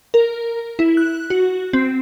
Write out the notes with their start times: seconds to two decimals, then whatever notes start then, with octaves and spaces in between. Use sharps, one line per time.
0.14 A#4
0.79 E4
0.97 F#6
1.30 F#4
1.73 C4